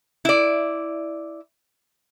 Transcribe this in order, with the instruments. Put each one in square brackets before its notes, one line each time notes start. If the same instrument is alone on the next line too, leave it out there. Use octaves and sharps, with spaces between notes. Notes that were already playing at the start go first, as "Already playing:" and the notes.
[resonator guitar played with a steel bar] E4 D5